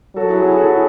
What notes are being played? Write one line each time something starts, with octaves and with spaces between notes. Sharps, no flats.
F#3 F#4 A4
E4 G#4
E4 G#4
F#4 A4
E4 G#4